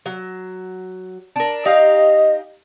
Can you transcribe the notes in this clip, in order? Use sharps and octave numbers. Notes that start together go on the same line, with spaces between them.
F#3
D4 A#4
D#4 G4 D#5 F5